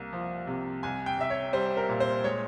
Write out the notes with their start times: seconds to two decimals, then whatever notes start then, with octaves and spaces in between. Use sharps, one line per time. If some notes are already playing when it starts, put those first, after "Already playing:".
Already playing: C2 A#3
0.13 F3
0.47 C3
0.83 C2 G#5
1.06 G5
1.18 C2 E5
1.30 C#5
1.53 G3 C5
1.77 A#4
1.89 A#2
2.00 C5
2.24 G#3 C#5